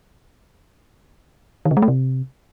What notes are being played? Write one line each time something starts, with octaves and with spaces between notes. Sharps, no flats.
D#3
C#3
G#3
A3
C3